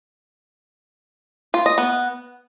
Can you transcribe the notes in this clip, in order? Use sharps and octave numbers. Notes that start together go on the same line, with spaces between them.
F4
D#5
B3